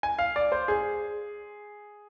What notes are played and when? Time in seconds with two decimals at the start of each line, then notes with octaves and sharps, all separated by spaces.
0.03 G#5
0.19 F5
0.36 D5
0.52 C5
0.68 G#4